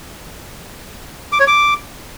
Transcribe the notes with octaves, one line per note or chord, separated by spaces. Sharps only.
D6
C#5
D6